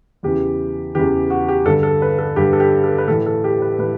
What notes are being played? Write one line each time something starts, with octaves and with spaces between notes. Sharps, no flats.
E2 C#3 E3 G4
E2 C#3 E3 G4
F#4
G4
G2 D3 A4
A4
B4
A4
G2 D3 G4
A4
G4
A4
B4
A2 E3 A4
A4
G4
B4
A2 E3 B4